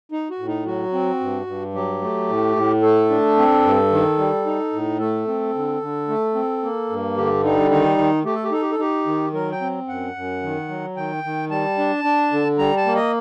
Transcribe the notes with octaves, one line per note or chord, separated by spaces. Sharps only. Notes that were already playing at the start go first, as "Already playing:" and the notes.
D#4
F#4
A2
D#4
F#3 F#4
C4
G2
G2
F#3 G4
A3
A2
A2
A3 A4
D4
C4
G2
D#3
G3
D#4
A2
A3 A4
C4
D3
D3
A3
C4
A#3
G2
D3 G4
G3 D#4
D#3 D#4
D#3
A3 G4
A4
G4
D#4 A4
G4
A4
D#4 G4
D#3
F#3 A#4
G5
C4
F#2 F#5
F#2
D#3
F#3
D#3 G5
D#3
G3 A5
D4
D4
D3
G3 A#5
A5
A#3
D#5